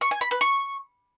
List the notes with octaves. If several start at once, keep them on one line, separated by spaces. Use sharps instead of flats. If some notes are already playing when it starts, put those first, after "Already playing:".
C#6
G#5
B5
B4
C#6